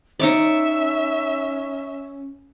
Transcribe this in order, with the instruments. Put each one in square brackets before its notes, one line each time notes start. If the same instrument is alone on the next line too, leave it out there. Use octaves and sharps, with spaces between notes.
[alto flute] C#4 [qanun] D#4 C#5 D5 [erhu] E5